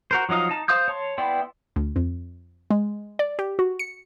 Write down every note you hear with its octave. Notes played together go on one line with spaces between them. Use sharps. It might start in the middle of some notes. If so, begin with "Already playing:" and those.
F#4 A#4 C5
F3 F#3 D#4 D#5 F5
D#4 A5
C5 F5 C6 D#6 G6
C#5 A5 C6
B3 E4 D5 G5 C6
D2
F2
G#3
D5
G4
F#4
C#7